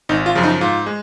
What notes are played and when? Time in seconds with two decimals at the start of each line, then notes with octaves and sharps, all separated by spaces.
0.09 G#1 D#4
0.26 F4
0.35 F#2 C#3 F3
0.43 D#4
0.61 G#2 F4
0.86 G#3